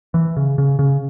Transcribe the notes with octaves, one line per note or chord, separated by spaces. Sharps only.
E3
C#3
C#3
C#3